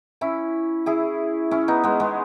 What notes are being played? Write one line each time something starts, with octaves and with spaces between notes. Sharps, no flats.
C#4 E4
E4 G#4
C#4 E4
B3 D#4
G#3 B3
G#3 B3